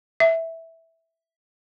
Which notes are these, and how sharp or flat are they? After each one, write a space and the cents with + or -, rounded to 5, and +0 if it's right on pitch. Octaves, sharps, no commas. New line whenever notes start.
E5 -10